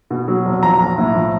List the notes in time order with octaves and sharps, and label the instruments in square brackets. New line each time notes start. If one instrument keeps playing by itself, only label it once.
[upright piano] B2
F#3
F1
F3 A#5
B1
A2
F3